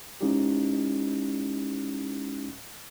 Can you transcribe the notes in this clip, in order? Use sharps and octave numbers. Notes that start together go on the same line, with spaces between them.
G#3 C#4 D#4 E4 G4